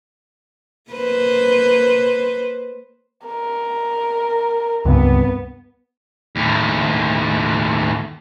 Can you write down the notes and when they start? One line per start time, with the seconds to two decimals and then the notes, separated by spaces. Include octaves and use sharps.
0.91 A#3 B4 C5
3.26 A#4
4.85 C#2 G2 C3 B3
6.36 D#2 A2